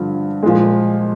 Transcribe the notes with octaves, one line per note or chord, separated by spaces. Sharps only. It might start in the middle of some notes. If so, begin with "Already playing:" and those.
Already playing: G2 D3 F3
A#2 F3 G#3